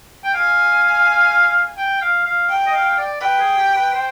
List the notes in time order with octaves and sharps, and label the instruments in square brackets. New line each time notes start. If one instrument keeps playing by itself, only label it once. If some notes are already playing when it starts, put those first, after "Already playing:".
[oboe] G5
[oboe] F5 [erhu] G#5
[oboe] G5
F5
F5
[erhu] G5
[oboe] D#5
F5
D5
[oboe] B4 [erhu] G5
[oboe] G#4
G4
B4
C5